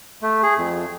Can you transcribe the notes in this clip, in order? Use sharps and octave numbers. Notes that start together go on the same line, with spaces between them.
A3
G#4
F2